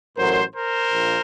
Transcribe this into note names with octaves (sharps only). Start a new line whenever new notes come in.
A1 A2 F#3 A#4 C5
A#4 C5
A#1 A#2